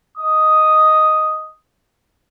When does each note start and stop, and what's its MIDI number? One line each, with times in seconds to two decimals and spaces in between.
0.18 1.50 75
0.18 1.50 87